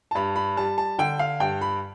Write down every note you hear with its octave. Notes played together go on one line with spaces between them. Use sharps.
A5
G2 B5
B5
G3 A5
A5
D3 G5
F5
G2 G5
B5